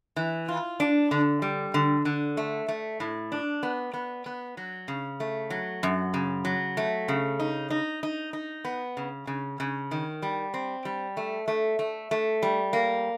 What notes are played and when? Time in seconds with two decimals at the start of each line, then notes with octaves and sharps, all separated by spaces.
0.16 E3
0.48 F4
0.80 D4
1.11 D3
1.42 G3
1.74 D3
2.05 D3
2.37 A3
2.68 A3
3.00 A2
3.32 D4
3.63 B3
3.94 B3
4.26 B3
4.57 F#3
4.88 C#3
5.20 A3
5.50 F#3
5.83 F#2
6.14 C#3
6.45 F#3
6.77 A3
7.08 C#3
7.40 D#4
7.70 D#4
8.03 D#4
8.33 D#4
8.65 B3
8.97 C#3
9.27 C#3
9.60 C#3
9.91 D#3
10.22 G3
10.54 C4
10.85 G3
11.17 A3
11.48 A3
11.79 A3
12.11 A3
12.43 G3
12.73 A#3